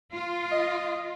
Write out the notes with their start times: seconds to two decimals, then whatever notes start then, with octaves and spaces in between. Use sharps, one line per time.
0.13 F4
0.52 D#5